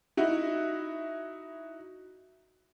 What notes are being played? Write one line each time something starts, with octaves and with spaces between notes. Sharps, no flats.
D#4 E4 F#4